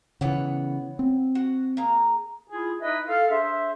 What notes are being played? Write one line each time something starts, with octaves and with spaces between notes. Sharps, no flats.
C#3 E3 B3 C#5 F#5
C4
F#4
A#3 G#4 A#5
E4 F4 G#4
D#4 E4 B4 D#5 E5
A4 F5
D4 G#4 C5 E5